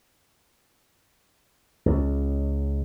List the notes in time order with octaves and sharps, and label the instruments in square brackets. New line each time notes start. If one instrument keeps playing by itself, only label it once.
[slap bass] C#2